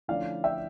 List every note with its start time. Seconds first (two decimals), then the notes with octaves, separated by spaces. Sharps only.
0.08 D3 F3 A3 C#4 E4 D5 F5
0.44 E5 G5